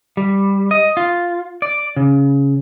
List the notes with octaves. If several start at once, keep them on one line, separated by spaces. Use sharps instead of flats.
G3
D#5
F4
D5
C#3